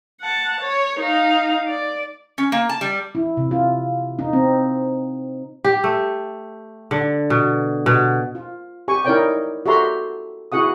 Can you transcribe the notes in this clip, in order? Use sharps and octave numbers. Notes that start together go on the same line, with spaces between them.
F#5 A5
C#5
D#4 F5
D5
C#4
A#3
A5
G3
E4
C3
F4
D#4
C4
G4
A3
D3
B2
B2
F4
G4 G#5 C#6
D#4 E4 A#4 C#5 D5 G5
F#4 G4 A4 E5 A#5 C6
E4 F#4 G#4 F#5 D#6